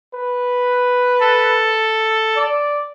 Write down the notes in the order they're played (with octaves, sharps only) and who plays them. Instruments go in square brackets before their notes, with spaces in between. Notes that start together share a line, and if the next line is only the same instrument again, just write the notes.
[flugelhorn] B4
[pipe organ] A4
[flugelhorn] D5